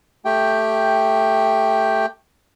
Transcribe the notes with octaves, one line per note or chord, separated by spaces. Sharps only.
A3 G4 G5